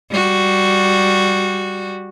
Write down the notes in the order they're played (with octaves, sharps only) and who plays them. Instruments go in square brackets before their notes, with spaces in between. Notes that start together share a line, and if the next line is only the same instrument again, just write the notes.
[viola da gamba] G3 F#4